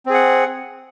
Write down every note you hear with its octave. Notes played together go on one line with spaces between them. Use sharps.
C4 G#4 F#5